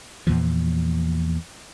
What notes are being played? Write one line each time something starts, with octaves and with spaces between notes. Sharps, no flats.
E2 A#2 E3 F3